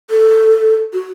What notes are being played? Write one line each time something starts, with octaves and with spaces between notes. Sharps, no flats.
A4
F#4